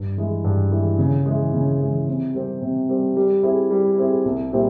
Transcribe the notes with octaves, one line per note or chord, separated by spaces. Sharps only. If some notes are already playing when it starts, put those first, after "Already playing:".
Already playing: G2
E3 G#3 E4
G2
E3 G#3 E4
C#3
E3 G#3
C#3
E3 G#3
C3
G3 C4 G4
C3
G3 C4 G4
G3
C4 E4 G#4
G3
C4 E4 G#4
C2
A#2 G3 C4 E4